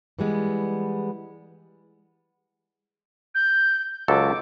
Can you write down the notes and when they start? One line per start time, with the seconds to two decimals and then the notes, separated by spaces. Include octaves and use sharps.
0.19 E3 G3 G#3 B3
3.35 G6
4.08 C#2 F#3 A4 D6